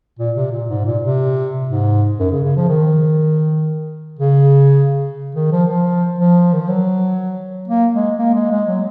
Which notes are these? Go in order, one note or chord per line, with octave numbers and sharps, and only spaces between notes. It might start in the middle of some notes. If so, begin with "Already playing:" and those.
A#2
C3
A#2
G#2
A#2
C3
G#2
F#2
C#3
C#3
F3
D#3
C#3
D#3
F3
F3
F3
D#3
F3
F#3
A#3
G#3
A#3
G#3
G#3
F#3